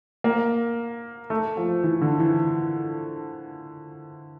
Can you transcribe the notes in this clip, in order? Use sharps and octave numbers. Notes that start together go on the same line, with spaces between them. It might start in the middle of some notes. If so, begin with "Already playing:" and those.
A#3
A3
F3
E3
D3
E3